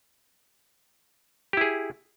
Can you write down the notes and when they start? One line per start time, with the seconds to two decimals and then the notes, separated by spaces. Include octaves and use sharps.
1.53 G4
1.57 E4
1.61 G#4